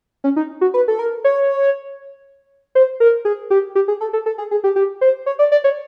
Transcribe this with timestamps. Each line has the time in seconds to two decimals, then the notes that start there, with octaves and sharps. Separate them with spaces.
0.24 C#4
0.36 D#4
0.61 F#4
0.74 B4
0.88 A4
0.99 A#4
1.24 C#5
2.75 C5
3.00 A#4
3.25 G#4
3.50 G4
3.75 G4
3.88 G#4
4.01 A4
4.13 A4
4.26 A4
4.38 G#4
4.51 G#4
4.64 G4
4.76 G4
5.01 C5
5.26 C#5
5.39 D5
5.52 D5
5.64 C#5